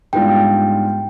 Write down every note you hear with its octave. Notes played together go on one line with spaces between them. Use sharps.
G#2 G3 B3 D4 F4 G5